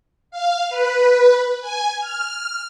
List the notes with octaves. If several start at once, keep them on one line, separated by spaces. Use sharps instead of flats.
F5
B4
G#5
F6